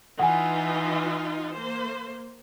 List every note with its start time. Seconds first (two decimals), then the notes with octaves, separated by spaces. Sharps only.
0.19 E3 D#4 F4 F#5 G#5
1.54 A#3 C5